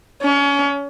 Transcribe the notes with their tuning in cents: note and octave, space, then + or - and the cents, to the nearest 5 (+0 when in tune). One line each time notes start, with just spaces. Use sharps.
C#4 +30